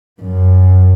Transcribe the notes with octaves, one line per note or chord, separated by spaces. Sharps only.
F#2